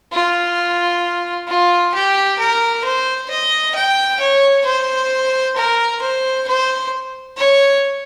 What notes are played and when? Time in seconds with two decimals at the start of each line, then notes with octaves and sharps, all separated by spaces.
0.13 F4
1.48 F4
1.94 G4
2.39 A#4
2.84 C5
3.30 D#5
3.75 G5
4.20 C#5
4.66 C5
5.56 A#4
6.02 C5
6.48 C5
7.37 C#5